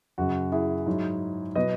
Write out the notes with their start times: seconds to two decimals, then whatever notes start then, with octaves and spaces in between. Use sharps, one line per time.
0.18 F#2 C#3 F#3 F#4
0.52 E4 G#4
0.86 G#2 F#3
1.55 B2 F#3 B4 D#5